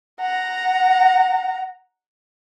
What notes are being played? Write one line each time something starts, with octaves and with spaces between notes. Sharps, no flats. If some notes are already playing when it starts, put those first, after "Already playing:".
F#5 A#5